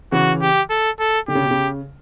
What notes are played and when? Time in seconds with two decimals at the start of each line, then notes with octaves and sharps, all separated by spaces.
0.12 C#3 E3 F#4
0.42 G4
0.70 A4
0.99 A4
1.28 D3 G4
1.35 C#3
1.43 B2
1.51 C#3